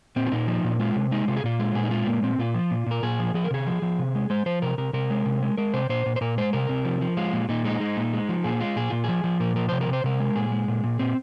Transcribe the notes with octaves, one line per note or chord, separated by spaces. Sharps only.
A#2 C4
F4
A#2 D#4
F3
A#2
G#3 F4
C3
G#3 D#4
C3 F4
G#4
A#2 F4
G#3
A#2 G#4
D#4
G#3 F4
A#2 A#3
A#2 C4
A#2 F4
F3
A#2
A#2 A#4
A#2 G#4
F3
F3 G#4
A#4
C3 G#4
F3
F3
C3
G#3
G#3 C5
F3 C5
C3 A#4
C3 A#4
C3 A#4
G#3
C3
G#3
G#3 A#4
C3 C5
A#2 C5
A#2
C5
A#2 A#4
G#3 C5
C3 A#4
C3
F3
F3
G#3 F4
A#2
A#2 D#4
G#3 D#4
G#3
A#2
G#3
F3
A#2 G#4
G#3 F4
A#2 G#4
A#2 F4
F3 G#4
F3
A#2 A#4
F3 A#4
C3 C5
A#4
C3 C5
C3 A#4
G#3
A#2 G#4
G#3
A#2
A#2
A#2 C4